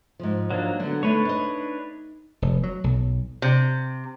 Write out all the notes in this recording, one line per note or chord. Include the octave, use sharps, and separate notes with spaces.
G#2 F3
F#3 A#3 D4
D3 F#3 B3
A3 D4 D#4 B4 C#5
D#4 D#5
F1
F#3
B1
C3